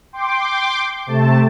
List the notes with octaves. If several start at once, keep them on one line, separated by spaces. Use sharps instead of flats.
G5 C6 D6
C3 A3 A5